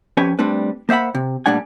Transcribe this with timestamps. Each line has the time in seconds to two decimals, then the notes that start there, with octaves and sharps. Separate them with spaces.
0.17 F2 C#4 G4 B4 G#5
0.39 G3 A3 C4 D4 B4
0.89 A#3 C5 E5 F#5 B5
1.15 C3
1.46 A#2 G3 A3 D4 F#5 G#5